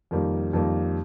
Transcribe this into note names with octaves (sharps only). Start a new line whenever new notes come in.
F2 D#3 G3 A#3
F2 D#3 G3 A#3